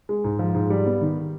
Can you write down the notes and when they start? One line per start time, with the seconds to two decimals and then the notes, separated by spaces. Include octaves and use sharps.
0.09 G#3
0.24 G#2
0.39 F3
0.55 G#2
0.70 G3
0.86 B3
1.01 D#3